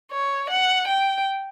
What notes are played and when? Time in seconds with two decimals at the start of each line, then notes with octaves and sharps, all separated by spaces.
0.11 C#5
0.50 F#5
0.87 G5